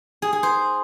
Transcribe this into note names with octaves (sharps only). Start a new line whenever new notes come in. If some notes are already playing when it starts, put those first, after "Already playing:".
G#4
G#4
C5